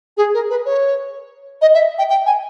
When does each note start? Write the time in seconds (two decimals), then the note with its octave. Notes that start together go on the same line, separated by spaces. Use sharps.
0.17 G#4
0.34 A#4
0.50 B4
0.66 C#5
1.62 D#5
1.74 E5
1.98 G5
2.10 G5
2.26 G#5